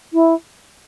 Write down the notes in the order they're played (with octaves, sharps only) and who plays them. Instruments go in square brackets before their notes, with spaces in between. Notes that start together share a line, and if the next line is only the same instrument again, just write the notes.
[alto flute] E4